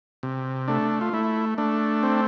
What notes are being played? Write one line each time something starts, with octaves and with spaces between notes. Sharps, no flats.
C3
A3 D4
F4
A3 E4
A3 D4
C4